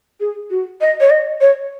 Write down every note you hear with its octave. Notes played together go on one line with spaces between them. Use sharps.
G#4
F#4
D#5
C#5
D#5
C#5